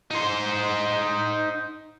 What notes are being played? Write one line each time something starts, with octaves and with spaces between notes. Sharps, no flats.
D#4 C5